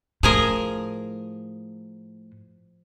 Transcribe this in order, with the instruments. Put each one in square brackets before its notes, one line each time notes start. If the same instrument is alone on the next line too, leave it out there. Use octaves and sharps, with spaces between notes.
[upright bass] A2 [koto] F3 G#4 A#4